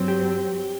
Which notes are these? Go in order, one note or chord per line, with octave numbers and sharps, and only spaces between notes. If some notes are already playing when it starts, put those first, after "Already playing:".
Already playing: G2 F#3 C4
G4